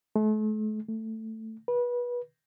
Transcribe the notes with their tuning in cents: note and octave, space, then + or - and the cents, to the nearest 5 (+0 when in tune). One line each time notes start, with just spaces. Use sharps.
A3 -40
A3 +10
B4 -25